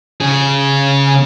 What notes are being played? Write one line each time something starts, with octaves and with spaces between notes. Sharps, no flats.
C#3 G#4